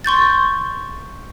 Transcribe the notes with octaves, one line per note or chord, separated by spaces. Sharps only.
C6 C#6 G6 A6